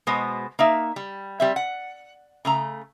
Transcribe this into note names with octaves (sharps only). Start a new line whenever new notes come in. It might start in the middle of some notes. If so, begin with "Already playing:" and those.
B2 G#3 B3 C5
A#3 D#4 E5
G3
G3 C4 E5
F#5
C#3 A3 A#5